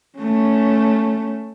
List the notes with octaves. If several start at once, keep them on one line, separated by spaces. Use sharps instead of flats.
A3 C#4